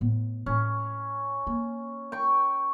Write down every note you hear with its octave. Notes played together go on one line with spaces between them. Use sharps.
A2 B3
A2 C#4 E4
A#3
G5 C#6